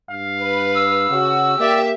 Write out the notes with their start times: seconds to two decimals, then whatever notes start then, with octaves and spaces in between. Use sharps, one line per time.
0.10 G2 F5
0.42 B4
0.75 E6
1.10 C#3 F#4
1.60 A#3 G4 D5 E5